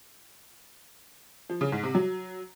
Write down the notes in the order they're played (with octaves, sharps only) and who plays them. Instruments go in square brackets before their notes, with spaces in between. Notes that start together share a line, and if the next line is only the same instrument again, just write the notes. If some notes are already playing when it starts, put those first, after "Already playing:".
[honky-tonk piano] F3
C#3
G#2
C3
F#3